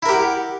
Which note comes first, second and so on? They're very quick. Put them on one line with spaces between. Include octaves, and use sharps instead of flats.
E4 A#4 G4 F#5